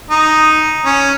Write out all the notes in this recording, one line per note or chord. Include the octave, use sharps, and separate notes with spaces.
D#4
C#4